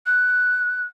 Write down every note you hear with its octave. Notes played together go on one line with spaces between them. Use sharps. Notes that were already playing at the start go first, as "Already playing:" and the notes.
F#6